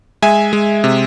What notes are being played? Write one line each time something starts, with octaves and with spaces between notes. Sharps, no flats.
G#3 E5 G#5
G#3
C3